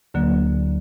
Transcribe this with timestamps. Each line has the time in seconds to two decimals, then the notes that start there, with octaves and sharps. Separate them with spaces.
0.14 D2 D3 F#3 A#3